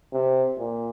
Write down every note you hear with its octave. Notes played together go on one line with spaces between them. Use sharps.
C3
A#2